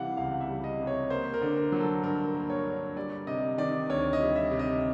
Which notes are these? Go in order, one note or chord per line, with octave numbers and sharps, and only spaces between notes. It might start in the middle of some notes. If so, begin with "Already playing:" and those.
Already playing: C3 E3 G3 F5 F#5
C#2 F5
E5
G3
D#5
C3
C#5
A#3 C5
A#4
D3
A#4
F#3
A4
G2 A#4
A#3
C#5
D3
G3 D5
C3 D#5
D#3 D5
D2 C#5
D#5
G3
E5
C3
D#5